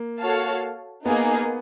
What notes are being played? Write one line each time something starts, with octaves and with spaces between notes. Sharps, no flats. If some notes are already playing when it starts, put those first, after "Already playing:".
Already playing: A#3
F#4 A4 C#5 F5 A5
A#3 B3 D#4 G#4